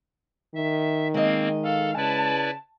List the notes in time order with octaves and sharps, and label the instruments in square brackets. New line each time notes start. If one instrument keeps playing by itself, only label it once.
[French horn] D#3 [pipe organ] E5
[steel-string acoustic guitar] G#3 D#5 [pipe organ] A#3 C4
[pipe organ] A4 [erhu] F5
[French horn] C#3 [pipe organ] E4 B4 D5 [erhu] A5